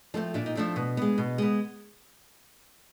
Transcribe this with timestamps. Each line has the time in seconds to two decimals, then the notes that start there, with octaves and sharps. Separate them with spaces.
0.14 F3 A3 C4 D4
0.34 A#2 D4
0.46 D#4
0.56 F3 A3 C4 D4
0.76 B2
0.97 G#3 B3
1.18 B2
1.38 G#3 B3